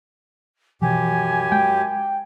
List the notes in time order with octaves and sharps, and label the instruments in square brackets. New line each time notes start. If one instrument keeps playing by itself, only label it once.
[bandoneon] F#2 G4 [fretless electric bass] B2 E3 F3 [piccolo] G#5
[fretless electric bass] G#3 [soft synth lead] G5